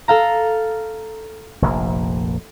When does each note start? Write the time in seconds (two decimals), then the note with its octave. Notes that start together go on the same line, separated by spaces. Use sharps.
0.08 A4 F5 A#5
1.62 F1 A#1 A#3